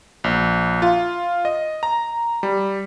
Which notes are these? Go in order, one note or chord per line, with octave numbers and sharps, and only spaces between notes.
A#1
F4
D#5
A#5
G3